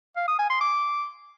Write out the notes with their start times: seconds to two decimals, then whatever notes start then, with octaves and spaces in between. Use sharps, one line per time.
0.16 F5
0.28 D#6
0.39 G#5
0.50 C6
0.61 D6